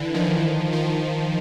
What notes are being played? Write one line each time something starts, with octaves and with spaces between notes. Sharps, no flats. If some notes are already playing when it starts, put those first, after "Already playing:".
Already playing: D3 E3
D#3 F3
D#3 F3